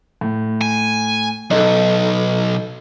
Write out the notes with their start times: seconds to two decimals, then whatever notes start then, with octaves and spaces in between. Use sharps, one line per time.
0.21 A2
0.62 G#5
1.51 B1 D#4 A4